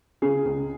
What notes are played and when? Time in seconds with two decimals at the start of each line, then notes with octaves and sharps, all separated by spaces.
0.22 C#3 G#4
0.45 C#2